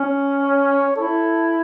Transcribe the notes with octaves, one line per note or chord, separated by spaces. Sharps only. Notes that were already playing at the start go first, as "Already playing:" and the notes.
Already playing: C#4
C#5
E4 A4